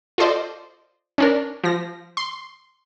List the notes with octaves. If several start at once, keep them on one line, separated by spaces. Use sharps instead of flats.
F4 A4 C5 D5 D#5
C#4 D4 A#4
F3 A#6
C6